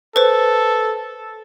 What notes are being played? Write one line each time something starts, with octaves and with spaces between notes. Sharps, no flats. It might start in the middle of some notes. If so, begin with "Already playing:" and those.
A4 B4 C5